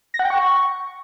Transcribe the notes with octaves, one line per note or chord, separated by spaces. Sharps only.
A#6
F#5
G5
C#6